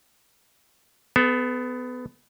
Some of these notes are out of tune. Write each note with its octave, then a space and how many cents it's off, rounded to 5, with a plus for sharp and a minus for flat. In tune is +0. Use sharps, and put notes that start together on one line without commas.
B3 +20 A4 -25